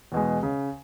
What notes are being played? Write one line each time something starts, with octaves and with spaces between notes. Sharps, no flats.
E2 B2 G#3
C#3